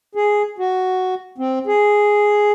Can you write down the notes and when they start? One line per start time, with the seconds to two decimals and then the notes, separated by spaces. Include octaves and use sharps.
0.15 G#4
0.58 F#4
1.38 C4
1.67 G#4